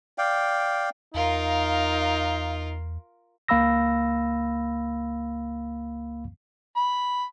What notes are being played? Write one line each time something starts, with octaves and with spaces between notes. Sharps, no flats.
D5 F5 G5
E2 D#4 F4 A#4 F5
C#2 A#3 F5 B5 E6 A#6
B5